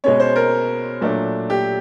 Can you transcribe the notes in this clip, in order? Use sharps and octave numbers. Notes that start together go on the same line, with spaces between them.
B2 G#3 C#4 C#5
C5
A#4
A#2 F#3 A3 D4
G4